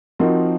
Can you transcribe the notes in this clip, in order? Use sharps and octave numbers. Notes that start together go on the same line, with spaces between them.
F3 C4 D#4 F#4 A#4